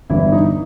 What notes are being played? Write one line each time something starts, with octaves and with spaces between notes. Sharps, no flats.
G1 G2 E3 G3 E4
D#4